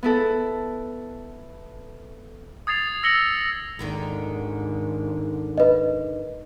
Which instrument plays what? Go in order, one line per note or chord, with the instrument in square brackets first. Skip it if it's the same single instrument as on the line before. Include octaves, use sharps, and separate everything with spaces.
[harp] B3 E4 A4
[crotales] D#6 G#6 A6 C7 F7
E6 A#6 C#7 F#7 G7
[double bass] G#1 [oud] D#2 D3 D#3
[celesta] B4 D#5